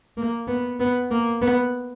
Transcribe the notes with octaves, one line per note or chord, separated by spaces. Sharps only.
A#3
B3
B3
A#3
B3